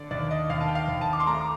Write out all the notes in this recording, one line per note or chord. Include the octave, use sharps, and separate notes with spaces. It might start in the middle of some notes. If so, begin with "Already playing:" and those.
Already playing: D3 D5
D#2 D5
D#5
D#2 F5
A5
G5
F5
D#2
A5
D6
C6
A3 A#5
D6